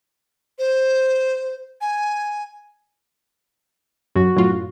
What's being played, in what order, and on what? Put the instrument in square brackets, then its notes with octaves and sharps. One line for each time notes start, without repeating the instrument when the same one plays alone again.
[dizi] C5
G#5
[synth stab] F#2 [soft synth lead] F#4
[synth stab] F#2 A2 F4